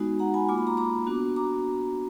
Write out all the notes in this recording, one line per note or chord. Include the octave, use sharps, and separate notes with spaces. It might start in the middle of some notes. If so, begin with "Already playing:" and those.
Already playing: G#3 B3 D#4 F#4
F#5 A#5
G#5 B5
A#3 F4 D6
B5
A#5 D6
A#5 D6
B3 D4 F#4
A#5 D6